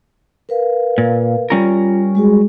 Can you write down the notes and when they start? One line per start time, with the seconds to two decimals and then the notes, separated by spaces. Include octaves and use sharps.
0.49 A#4 B4 F5
0.98 A#2
1.50 G3 C#4 F4 A#4
2.15 G#3 F#4 G#4